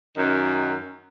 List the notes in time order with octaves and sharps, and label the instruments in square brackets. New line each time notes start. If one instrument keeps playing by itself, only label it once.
[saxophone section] F#2 D#3